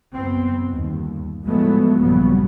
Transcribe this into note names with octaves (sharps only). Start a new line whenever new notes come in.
F#1 B3 C4
G1 D#2
A2 F3 F#3 G#3 A3 B3
A#1 G2 C#3 F#3 G3 B3